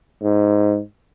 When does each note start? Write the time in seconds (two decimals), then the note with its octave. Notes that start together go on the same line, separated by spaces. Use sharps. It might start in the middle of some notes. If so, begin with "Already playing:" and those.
0.21 G#2